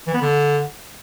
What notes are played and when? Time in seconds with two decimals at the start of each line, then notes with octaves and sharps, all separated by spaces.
0.07 E3
0.14 B3
0.21 D3